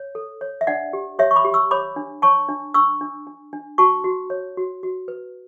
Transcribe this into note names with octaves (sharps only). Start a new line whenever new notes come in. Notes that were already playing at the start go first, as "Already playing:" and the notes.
Already playing: C#5
A4
C#5
E5
D4 D5 F#5
G4
G4 C#5 E5
C#6
B5 D6
G4
C#6 E6
C#5 B5 D6
D4
C#5 A5 C#6
D4
D4 C#6 E6
D4
D4
D4
F#4 A5 C#6
F#4
C#5
F#4
F#4
B4